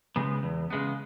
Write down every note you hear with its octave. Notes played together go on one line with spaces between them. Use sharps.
C#3 G#3 B3
E2
C#3 G#3 B3